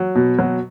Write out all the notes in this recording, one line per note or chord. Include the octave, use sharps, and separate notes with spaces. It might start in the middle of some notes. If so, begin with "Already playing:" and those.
Already playing: F#3
B2
F#3